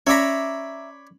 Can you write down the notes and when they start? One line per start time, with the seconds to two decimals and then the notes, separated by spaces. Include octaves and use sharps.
0.07 C#4 C#5 D5 E5 A#5 B5